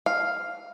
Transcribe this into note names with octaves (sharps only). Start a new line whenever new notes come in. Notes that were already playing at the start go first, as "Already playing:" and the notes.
F5